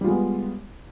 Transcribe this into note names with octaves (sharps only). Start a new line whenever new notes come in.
G3 G#3 B3 F4